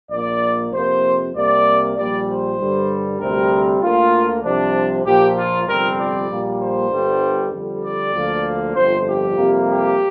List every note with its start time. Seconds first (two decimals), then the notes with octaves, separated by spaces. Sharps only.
0.10 A#1 A#2 A#3 D5
0.72 F2 C3 A#3 C5
1.34 C2 C3 A#3 D5
1.95 A#1 A#2 G3 D5
2.27 C5
2.57 G2 D3 G3
3.19 D2 C3 G3 C4 A#4
3.81 D2 D3 A#3 F4
4.43 C2 C3 F3 D4
5.04 A#1 A#2 F3 A#3 G4
5.36 F4
5.66 G1 F2 C3 G3 C4 A#4
5.98 D5
6.28 A#1 A#2 G3 A#3
6.59 C5
6.90 G1 G2 D3 G3
7.52 F2 D3 G3
7.83 D5
8.13 D2 D3 F3 A#3
8.75 G1 F2 F3 C5
9.05 G4
9.36 F2 C3 G3 A#3
9.68 G4